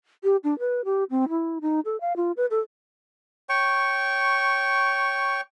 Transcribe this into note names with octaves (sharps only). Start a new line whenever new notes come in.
G4
D4
B4
G4
C4
E4
D#4
A4
F5
F4
B4
A4
C#5 G5 C#6